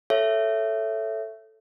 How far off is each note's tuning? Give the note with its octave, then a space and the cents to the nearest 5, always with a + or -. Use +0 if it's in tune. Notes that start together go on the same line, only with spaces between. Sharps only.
A4 +0 C#5 +0 E5 +10